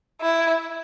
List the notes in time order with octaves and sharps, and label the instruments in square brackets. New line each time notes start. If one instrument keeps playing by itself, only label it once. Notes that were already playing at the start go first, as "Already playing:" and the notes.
[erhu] E4